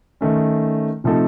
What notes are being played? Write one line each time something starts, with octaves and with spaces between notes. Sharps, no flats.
D#3 A3 C#4
C3 F3 A3 D#4 A4